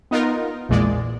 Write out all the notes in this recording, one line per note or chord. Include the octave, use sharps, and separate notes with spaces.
B3 D#4 F4 A#4
A#1 E2 A#2 G#3 D5